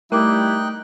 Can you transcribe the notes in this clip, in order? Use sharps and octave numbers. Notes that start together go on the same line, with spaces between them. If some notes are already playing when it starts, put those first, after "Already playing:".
G3 A3 D#4 E4 A#4 G5 D6 F#6